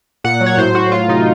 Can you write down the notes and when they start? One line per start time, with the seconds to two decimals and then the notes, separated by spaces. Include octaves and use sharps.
0.24 A#2 F#5
0.41 F#3
0.46 C#5
0.57 A2 C5
0.75 A2 F#4
0.92 F#3 F4
1.08 C3 D#4